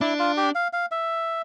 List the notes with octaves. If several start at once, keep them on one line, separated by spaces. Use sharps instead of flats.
D4 E4
F4
G4
F5
F5
E5